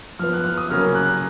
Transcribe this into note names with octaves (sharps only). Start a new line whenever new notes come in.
F3 B3 F6
F#6
F6
D#6
C#3 F#3 A#3 C#4 F6
F#6